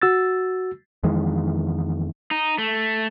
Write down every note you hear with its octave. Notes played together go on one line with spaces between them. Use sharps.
F#4 E6 A6
F2 D#3 E3 G#3
D#4
A3